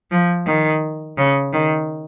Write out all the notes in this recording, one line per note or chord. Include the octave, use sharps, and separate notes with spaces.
F3
D#3
C#3
D#3